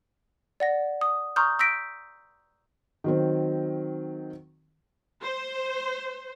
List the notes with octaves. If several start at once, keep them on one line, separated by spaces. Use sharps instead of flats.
D5 F#5 A#6
D#6
A#5 C6 C#6 D#6 F6 G6
C6 E6 G6 A#6 B6 D7
D#3 F#3 C4
C5